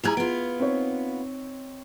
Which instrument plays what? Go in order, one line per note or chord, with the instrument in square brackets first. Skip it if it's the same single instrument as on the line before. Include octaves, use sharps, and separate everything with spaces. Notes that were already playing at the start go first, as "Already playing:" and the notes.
[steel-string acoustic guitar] G3 E4 G#4 [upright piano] A#5 G#6 F7
[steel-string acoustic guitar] B3 F4 [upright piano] D7
[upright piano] C4 D#4 C#5